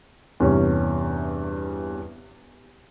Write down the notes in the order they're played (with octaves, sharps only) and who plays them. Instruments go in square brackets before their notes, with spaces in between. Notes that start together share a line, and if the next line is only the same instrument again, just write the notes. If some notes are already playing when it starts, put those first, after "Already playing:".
[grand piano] E2 G2 C3 C#4